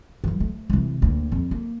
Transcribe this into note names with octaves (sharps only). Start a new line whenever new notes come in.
E3 F#3
A3
C3 E3
D2 A#3
F2
A#3